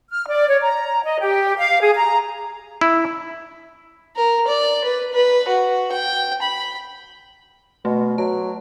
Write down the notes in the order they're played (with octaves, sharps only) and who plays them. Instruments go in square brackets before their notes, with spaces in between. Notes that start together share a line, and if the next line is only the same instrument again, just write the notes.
[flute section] F6
D5
C#5
A#5
D#5
G4
F5
G#4
A#5
[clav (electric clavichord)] E4
[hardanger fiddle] A#4
D5
B4
B4
F#4
G5
B5
[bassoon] B2 [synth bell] A3
[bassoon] F#3 [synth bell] A5